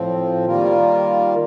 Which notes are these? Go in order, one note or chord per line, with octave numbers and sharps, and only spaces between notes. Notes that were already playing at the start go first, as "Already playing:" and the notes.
Already playing: A2 F3 C4
D#3 G3 A#3 F4 A#4